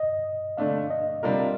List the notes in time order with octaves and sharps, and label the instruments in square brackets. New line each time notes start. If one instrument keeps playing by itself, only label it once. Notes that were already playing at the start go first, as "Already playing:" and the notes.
Already playing: [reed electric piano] D#5
[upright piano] D3 A3 D4 [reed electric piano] F5
[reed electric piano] D#5
[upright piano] C3 G3 D4 F4 A#4